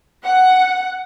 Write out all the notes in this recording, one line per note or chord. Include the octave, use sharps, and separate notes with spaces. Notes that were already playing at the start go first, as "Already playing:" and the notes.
F#5